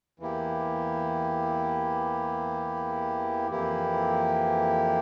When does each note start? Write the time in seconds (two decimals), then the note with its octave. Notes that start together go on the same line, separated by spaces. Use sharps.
0.19 E2 E3 A#3 E4 G4
3.50 F2 E3 A#3 E4 G4